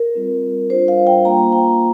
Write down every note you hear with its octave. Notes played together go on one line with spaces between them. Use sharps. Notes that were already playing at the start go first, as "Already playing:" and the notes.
Already playing: A#4
G3 C4 F4
G3 D4 F4 C5
F5
G5
A#3 F4 A#5
G5